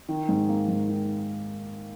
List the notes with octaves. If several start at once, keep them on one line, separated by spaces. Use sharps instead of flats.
D#3
G#2
A#3
G#2
D#3